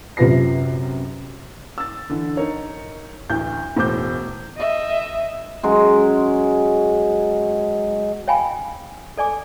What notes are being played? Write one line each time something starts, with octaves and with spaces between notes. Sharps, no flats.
F#2 C3 F4 B4 A#6 C7
E6 A6
D3 E3
D#4 A#4 C#5
A1 D2 E4 G6
E1 A2 C5 D6 G6
D#5 E5
F#3 G#3 C#4
C#5 F5 G5 G#5 B5
A4 D5 G#5 D6